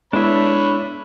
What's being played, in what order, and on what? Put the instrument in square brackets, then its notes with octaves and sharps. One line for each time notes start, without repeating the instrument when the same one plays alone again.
[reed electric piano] G#3 B3 E4 [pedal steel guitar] D4 E5 [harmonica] C#5 B5